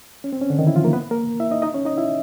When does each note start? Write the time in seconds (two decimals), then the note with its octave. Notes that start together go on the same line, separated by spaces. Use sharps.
0.24 C#4
0.33 C4
0.41 C#4
0.50 D3 D4
0.59 D#3 D#4
0.67 E3 E4
0.76 F3 F4
0.84 A#3 A#4
0.93 B3 B4
1.11 A#3 A#4
1.40 E4 E5
1.51 D#4 D#5
1.62 D#4 D#5
1.74 C#4 C#5
1.85 D#4 D#5
1.97 E4 E5